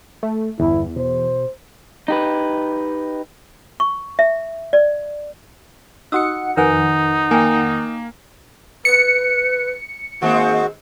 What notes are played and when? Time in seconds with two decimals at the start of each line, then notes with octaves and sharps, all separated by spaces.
0.23 A3
0.59 G1 E2 E4
0.96 B2 C5
2.08 D#4 G4 B4
3.80 C#6
4.19 E5
4.73 D5
6.12 D#4 F#4 F#5 D#6 E6 C#7
6.57 F2 D#3 D#4 A#4 B4 F#5 G#5
7.31 A#3 G5 G#5
8.85 B4 C#7
10.22 D#3 G#3 A#3 C4 F#4